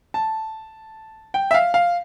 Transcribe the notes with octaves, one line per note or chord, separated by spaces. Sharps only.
A5
G5
E5
F5
F5